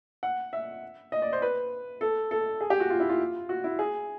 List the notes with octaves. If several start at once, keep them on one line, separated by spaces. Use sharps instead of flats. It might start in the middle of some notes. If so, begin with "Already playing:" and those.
F#5
E5
D#5
D5
C5
B4
A4
A4
G#4
G4
F#4
F4
E4
F4
F#4
E4
G#4